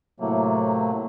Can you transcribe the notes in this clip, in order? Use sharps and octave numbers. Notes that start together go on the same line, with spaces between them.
A2 C3 F#3 A3 A#3